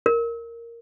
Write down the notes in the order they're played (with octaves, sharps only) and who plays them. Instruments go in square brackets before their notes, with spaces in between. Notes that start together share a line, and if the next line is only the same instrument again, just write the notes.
[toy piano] A#4